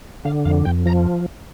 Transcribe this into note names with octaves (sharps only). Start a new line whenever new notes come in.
D3 F5
F2 F5
F2 G5
F3 A#5